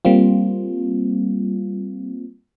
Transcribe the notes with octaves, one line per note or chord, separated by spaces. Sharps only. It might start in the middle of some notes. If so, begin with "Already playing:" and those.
G3 A#3 C4 F4